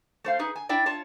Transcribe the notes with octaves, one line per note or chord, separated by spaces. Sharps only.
A3 C5 F5
D#4 G#4 B4
G#5
D4 E4 D5 G5
F4 C#5 A5